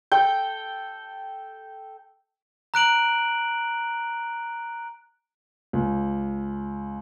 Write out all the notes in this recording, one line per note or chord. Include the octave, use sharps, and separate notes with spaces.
A4 G5
A#5 F#6 D7 F#7
C#2